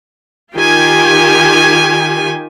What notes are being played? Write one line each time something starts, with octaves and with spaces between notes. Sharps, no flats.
D#3 F4 G4 G5 G#5